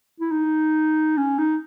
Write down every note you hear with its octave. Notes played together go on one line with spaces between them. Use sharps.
E4
D#4
C#4
D#4